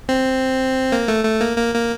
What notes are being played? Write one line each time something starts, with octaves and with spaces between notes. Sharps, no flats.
C4
A#3
A3
A3
A#3
A#3
A#3